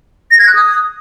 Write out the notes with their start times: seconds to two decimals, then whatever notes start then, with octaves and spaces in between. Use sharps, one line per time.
0.31 A#6
0.39 G#6
0.47 F#6
0.55 D#6